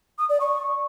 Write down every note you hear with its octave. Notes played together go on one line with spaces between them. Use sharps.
D#6
D5
C#6